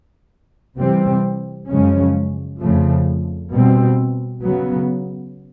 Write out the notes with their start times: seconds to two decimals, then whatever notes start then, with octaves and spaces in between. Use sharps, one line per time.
0.77 C3 E3 G3 C4
1.68 F#2 C#3 F3 G#3 C#4
2.60 F2 C#3 F3 A3
3.50 B2 G3 C4
4.41 C#3 F#3 B3